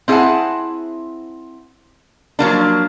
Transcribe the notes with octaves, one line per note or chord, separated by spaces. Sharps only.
C4 E4 G#4 F5 F#5 A5
F3 F#3 A#3 D4